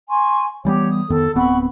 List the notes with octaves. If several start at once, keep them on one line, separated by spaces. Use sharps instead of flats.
G#5 C6 C#6
E3 G3 B3 G4 C#5
D#6
F2 D#3 B3 A4
D1 B3 C4 F#5 B5 C#6